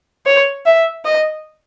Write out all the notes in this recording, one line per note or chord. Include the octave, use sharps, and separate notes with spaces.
C#5
E5
D#5